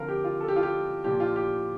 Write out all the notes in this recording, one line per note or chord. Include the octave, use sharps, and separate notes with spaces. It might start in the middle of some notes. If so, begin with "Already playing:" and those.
Already playing: D3 F3 C4 A#4 F5
G4
F4
A4
G4
F4
G4
A#2 F3 A#3 G4
F4
G4